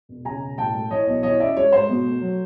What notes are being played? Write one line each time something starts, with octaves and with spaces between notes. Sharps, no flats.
E1
C#3 G#5 A#5
E1
A2 G5 A5
A3
E3 C#5 D#5
B1
E3 C#5 D#5
C#4 D5 E5
G#3 C#5
G#2 C5
B2
A3
F#3